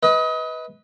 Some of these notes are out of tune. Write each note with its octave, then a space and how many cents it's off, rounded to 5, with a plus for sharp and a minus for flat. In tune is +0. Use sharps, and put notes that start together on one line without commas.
B4 +0 D#5 +30